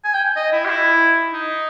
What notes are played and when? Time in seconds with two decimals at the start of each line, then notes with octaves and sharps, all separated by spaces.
0.04 G#5
0.14 G5
0.36 D#5
0.52 E4
0.65 G4
0.69 E4
1.33 D#4